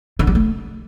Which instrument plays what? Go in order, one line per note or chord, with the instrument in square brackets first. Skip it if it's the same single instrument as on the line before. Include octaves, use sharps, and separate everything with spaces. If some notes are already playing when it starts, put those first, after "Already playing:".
[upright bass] D3
G3
A3